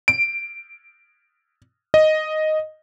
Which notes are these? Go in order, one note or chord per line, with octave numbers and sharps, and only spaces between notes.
D7
D#5